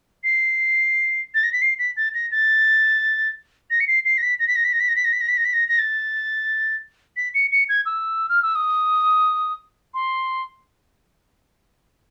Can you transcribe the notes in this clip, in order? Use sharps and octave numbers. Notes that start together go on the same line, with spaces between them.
C7
A6
A#6
B6
C7
B6
A6
A#6
A6
A#6
C#7
C7
C7
A#6
B6
A#6
B6
A#6
B6
A#6
B6
A#6
B6
A#6
B6
A#6
B6
A#6
B6
A#6
A#6
A6
B6
C#7
C#7
G#6
E6
F6
E6
D#6
C6